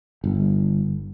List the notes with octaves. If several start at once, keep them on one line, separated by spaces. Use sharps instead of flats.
G1